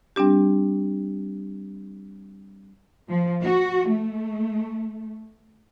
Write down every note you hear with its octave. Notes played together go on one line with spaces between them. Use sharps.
G3 C4 D4 G4
F3
F#4
A3